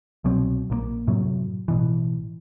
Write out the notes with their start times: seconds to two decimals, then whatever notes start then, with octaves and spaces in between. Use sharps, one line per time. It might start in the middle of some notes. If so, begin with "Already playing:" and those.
0.24 C2 B2 F#3 C4
0.70 A#1 C#3 A#3
1.07 F#2 A2 C3 F#3
1.68 A1 B2 E3